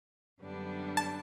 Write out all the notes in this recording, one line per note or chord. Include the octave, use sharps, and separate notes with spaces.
F#2 D3 G3 B3 D4
A5